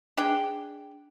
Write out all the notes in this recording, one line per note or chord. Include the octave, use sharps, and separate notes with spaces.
D4 G#4 G5